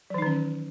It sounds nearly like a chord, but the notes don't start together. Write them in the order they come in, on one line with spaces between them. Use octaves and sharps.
F#3 E3 D#4 D#3 C#4